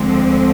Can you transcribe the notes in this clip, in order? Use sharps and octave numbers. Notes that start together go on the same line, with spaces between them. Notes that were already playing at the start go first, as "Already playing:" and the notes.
Already playing: D2 D3 F3 G#3 C4